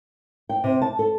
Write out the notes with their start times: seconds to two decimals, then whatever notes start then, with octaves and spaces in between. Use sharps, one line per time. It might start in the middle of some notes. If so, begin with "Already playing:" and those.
0.49 G5
0.64 C3
0.82 A5
0.99 A4